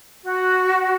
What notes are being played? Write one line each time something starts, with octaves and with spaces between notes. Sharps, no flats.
F#4